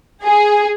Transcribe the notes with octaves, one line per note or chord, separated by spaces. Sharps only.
G#4